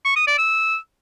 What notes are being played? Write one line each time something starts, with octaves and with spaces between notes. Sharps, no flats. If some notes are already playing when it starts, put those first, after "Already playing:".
C#6
D#6
D5
E6